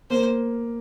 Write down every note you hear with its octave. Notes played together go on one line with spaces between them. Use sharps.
A#3 C5